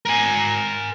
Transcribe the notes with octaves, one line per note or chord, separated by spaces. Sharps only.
A#4 G#5